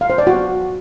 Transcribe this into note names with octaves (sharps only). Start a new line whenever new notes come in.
F5
C5
D5
F#4